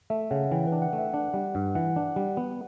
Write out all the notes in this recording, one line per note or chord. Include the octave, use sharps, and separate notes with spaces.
A3 E5
C#3 F#5
E3 G5
B4
D4
F#5
A3
E5
D4 F#5
G3
G2
E3 F#5
D4
G3
B3